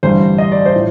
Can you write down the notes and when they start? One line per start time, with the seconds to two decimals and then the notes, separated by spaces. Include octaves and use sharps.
0.03 A1 G2 D3 G3 C5
0.38 D#5
0.52 D5
0.66 C5
0.74 A2 F3